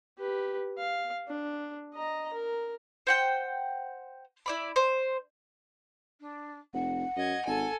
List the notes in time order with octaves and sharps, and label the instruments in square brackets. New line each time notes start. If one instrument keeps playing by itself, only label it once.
[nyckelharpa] G4 B4
F5
D4
D#5 A#5
A#4
[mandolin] C5 F#5 G5
E4 D5 B5
C5
[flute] D4
[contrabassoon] F1 [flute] F#5
[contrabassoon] F#2 [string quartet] D#5 G#6
[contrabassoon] G#1 [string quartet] A4 G#5